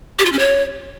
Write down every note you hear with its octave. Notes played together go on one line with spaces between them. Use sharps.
G4
F4
C#4
C#5